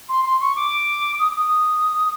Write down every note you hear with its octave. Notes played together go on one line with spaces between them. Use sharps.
C6
C6
C#6
D6
D#6
D#6